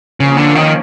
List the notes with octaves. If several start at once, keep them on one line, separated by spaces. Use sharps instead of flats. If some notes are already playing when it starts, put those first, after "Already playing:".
C#3 F3 A#3 C#4
D3
D#3